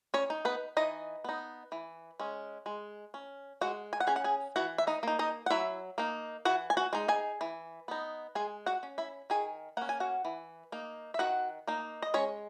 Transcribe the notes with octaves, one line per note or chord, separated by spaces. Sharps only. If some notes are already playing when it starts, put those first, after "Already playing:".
C#4 C#5
D#4
B3 B4
E3 D#4 D#5
B3 D#4
E3
G#3 C#4
G#3
C#4
G#3 F#4 F#5
G#5
F#5
C#4 G#4 G#5
F#5
G#4 G#5
E3 F#4 F#5
E5
D#4 D#5
A#3 D#4
D#4 D#5
F#5
F#3 E4 E5
A#3 D#4
E3 F#4 F#5
G#5
F#4 F#5
G#3 D#4
G#4 G#5
E3
B3 D#4
G#3 G#4 G#5
F#4 F#5
C#4
E4 E5
D#3 G#4 G#5
A#3 C#4 F#5
G#5
F#4 F#5
E3
A#3 D#4
E5
D#3 F#4 F#5
A#3 D#4
D#5
G#3 C#4 C#5